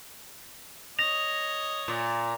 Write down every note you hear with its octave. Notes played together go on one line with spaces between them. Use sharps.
C#5 D#5 A#6 F7
A#2